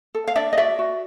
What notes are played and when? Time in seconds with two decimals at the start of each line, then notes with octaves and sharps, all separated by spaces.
0.15 A4
0.28 F5
0.35 D4 D5 E5
0.53 D#5
0.57 F#4 D5 E5
0.79 F#4